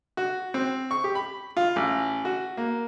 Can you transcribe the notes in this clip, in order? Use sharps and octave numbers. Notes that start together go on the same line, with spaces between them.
F#4
C4
C#6
G4
B5
F4
A1
F#4
A#3